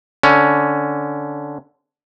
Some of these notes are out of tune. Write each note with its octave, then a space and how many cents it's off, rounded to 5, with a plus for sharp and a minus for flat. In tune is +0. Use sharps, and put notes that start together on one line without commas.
D3 +0 C#4 +5